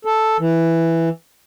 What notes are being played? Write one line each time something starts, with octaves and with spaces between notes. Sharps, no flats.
A4
E3